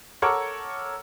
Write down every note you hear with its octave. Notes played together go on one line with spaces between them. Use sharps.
A4 A#4 C#5 F#5 C#6 D6